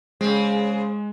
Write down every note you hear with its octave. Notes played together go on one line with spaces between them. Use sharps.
C#3 G#3 C4